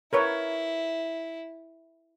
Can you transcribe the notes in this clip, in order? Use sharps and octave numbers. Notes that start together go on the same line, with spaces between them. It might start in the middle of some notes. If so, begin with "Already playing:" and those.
E4 A#4 B4 C#5